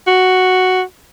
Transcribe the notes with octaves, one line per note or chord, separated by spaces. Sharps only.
F#4